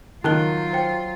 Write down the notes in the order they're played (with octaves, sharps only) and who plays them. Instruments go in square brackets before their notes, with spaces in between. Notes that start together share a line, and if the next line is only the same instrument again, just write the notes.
[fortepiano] D#3 [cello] F#3 F4 [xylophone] A5 F#6 G7
[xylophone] C5 G5